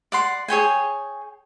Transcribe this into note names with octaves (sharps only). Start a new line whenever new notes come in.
D5 F#5 C6
G#4 C#5 G5 G#5